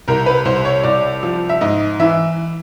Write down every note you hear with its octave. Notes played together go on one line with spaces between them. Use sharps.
C2 A#4
B4
C2 C5
C#5
C2 D5
F3
E5
G#2 D#5
E3 E5